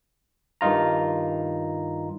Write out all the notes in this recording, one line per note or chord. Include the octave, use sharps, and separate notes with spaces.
G2 D#3 D#4 F4 A#5